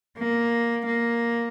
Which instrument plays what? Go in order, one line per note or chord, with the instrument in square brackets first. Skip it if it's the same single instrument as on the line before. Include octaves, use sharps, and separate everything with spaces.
[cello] A#3
A#3